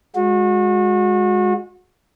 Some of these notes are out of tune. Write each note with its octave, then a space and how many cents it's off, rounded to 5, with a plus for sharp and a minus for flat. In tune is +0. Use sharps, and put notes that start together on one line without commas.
G#3 -10 F#4 -35